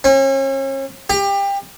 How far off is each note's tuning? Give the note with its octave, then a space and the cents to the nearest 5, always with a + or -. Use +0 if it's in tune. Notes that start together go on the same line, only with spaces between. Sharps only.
C#4 -40
G4 +25